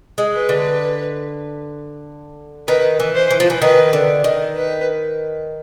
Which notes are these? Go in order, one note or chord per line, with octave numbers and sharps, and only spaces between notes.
G#3
B4
D3
D#3 B4
E3
C5
E3
F3
E3
D#3 B4
D3
D#3
B4